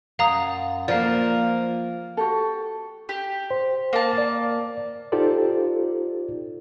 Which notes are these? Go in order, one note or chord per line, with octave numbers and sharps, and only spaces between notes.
F#2 F5 A#5 D#6
F3 A#3 A#4 D5 F5
F#4 G4 A4
G4
C5
A#3 A5
D5
D#4 F4 G4 A4 C5 D5